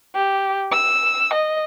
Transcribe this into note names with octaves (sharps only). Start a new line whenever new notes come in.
G4
E6
D#5